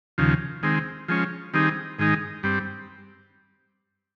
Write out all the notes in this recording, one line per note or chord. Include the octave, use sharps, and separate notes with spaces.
D#2 C#3 F3
D#3 G#3 C4
F3 G#3 C#4
D#3 G3 C4 D#4 G#4
G#2 D#3 G#3 D#4
G2 G3 C4